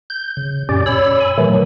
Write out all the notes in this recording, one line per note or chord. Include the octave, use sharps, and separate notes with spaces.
G6
C#3
F#2 A#2 C#4 G4 D5
C#5 B5 E6
G#5 B5
A#2 D#3 E3 F#3 A3